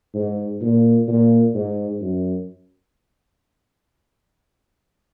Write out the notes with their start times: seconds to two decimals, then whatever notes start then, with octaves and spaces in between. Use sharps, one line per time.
0.14 G#2
0.61 A#2
1.08 A#2
1.55 G#2
2.01 F#2